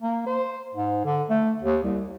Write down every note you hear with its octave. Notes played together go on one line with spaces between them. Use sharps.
A#3
C5
G#2
D3
A3
D#2
C2